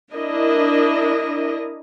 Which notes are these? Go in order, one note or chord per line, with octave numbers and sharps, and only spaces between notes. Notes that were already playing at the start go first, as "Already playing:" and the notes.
D4 E4 A#4 D#5